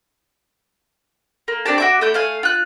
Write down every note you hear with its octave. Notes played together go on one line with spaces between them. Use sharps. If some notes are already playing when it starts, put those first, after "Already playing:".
A#3
C4 D4 G4 A5
F#4 E5 D6
A3 E4 G6
A3 F5 G#5
F4 F#6